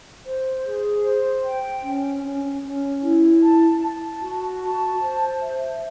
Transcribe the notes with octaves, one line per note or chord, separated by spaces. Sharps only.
C5
G#4
C5
G5
C#4
C#4
C#4
E4
A5
A5
F#4
A5
C5
E5